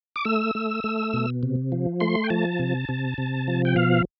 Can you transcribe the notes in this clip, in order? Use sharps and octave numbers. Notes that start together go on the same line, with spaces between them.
D6
A3 E6
A3
A3
B2
C3
F3
A3 C6
G5
F3 A5
C3
C3
C3
F3
G5
B2 F5